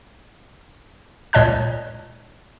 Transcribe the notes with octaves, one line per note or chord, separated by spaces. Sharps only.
C#2 A#2 C#5 D#5 A5 F#6